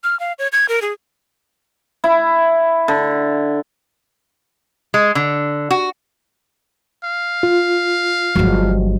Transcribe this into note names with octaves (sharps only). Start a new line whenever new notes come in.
F6
F5
C#5
G#6
A#4
G#4
E4
D3
G#3
D3
F#4
F5
F4
G1 F3 F#3 G#3 F#4